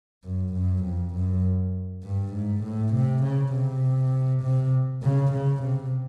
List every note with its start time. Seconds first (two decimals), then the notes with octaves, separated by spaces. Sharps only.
0.24 F#2
0.54 F#2
0.84 F2
1.14 F#2
2.04 G2
2.34 G#2
2.63 A2
2.93 C3
3.22 C#3
3.53 C3
4.43 C3
5.02 C#3
5.32 C#3
5.62 C3